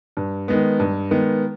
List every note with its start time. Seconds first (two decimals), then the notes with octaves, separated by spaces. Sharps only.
0.17 G2
0.48 D#3 G#3 B3
0.80 G2
1.11 D#3 G#3 B3